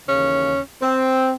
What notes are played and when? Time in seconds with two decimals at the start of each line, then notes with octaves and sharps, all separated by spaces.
0.08 D#2 C#3 E3 C#4
0.81 C4